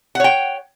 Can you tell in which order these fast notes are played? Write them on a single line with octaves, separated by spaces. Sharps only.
F#5 C#5 G5